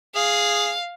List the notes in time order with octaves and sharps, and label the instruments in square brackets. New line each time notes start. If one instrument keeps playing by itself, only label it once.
[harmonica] G#4 [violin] F5